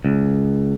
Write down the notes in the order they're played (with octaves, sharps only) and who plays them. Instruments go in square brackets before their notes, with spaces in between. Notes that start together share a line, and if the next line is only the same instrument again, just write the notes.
[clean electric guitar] C#2